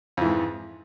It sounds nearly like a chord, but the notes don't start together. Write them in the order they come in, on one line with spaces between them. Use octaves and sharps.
F2 E3 G#2